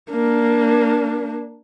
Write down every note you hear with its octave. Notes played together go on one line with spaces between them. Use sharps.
A#3 D4